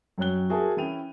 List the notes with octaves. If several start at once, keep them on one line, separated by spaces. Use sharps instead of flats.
F#2 F#3 C#5 G5 F#6 G7
F#4 G#4 A#4 E5 G#5 A5
E3 C#4 E4 G5 D#7 F7